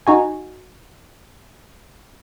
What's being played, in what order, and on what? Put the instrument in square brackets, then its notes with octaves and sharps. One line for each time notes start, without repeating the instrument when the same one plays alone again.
[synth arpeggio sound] D#4 F#4 G#5